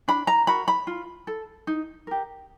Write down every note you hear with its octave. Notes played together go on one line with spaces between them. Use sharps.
D4 B5
A#5
F#4 A#4 B5
B5
F4
A4
D#4
G4 A#4